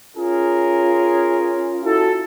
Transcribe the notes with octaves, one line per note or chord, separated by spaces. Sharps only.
C#4 F4 G#4 A#4
E4 F#4 A4